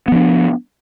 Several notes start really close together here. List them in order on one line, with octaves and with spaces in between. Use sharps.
B3 F3 D4